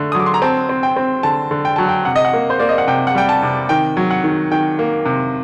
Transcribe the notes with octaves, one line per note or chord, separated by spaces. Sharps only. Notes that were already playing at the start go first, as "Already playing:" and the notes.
Already playing: D3 A3
D#6
F#3 D6
C6
A#5
C4 A5
C4
G5
C4
D3 A5
D3
G5
F#3 A5
G5
C3 F#5
D#5
F#5
A#3
C5
A#3 D5
D#5
F#5
C3 G5
F#5
G3 G5
A5
C3
D#3 G5
F#3
F#5
D#3
D#3 G5
A#3
C3